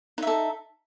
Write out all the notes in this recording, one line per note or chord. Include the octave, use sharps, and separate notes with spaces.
D#4 A4 E5